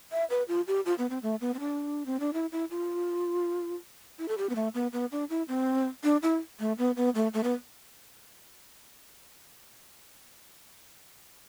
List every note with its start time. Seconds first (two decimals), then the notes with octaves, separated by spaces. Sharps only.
0.12 E5
0.30 B4
0.48 F4
0.68 G4
0.86 F4
0.98 B3
1.10 C4
1.23 A3
1.41 B3
1.54 C4
1.60 D4
2.06 C4
2.20 D4
2.33 E4
2.52 E4
2.71 F4
4.19 E4
4.28 A4
4.38 G4
4.49 B3
4.55 A3
4.74 B3
4.93 B3
5.12 D4
5.30 E4
5.48 C4
6.04 D4
6.23 E4
6.60 A3
6.78 B3
6.97 B3
7.15 A3
7.34 A3
7.43 B3